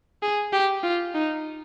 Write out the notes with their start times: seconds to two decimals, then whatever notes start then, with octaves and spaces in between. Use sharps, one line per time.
0.22 G#4
0.53 G4
0.83 F4
1.15 D#4